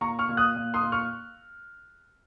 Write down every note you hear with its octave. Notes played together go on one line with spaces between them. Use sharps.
A#2 A#5 C#6
C#6 F6
A#2
D#6 F#6
A#2
C6 D#6
A#2
C#6 F6